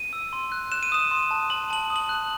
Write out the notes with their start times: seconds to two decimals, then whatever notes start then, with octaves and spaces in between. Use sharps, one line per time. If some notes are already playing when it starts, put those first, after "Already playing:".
Already playing: D#7
0.13 E6
0.33 C6
0.52 F#6
0.72 F#6 E7
0.83 D#7
0.92 D#6 E7
1.11 C6
1.31 A5
1.50 A5 F#7
1.70 A5 F#7
1.90 D#6
1.96 F#7
2.09 F#6